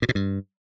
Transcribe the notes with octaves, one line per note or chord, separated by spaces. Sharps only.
A#2
B2
G2